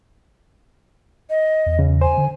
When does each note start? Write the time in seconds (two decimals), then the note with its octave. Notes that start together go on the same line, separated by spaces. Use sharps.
1.30 D#5
1.66 E2
1.79 C#2 C#3
2.01 C5 G#5
2.17 D3